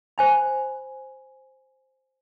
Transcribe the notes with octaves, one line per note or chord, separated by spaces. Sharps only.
C5 G#5 B5